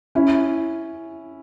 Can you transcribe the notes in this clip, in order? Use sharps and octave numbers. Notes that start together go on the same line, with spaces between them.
C#4 E4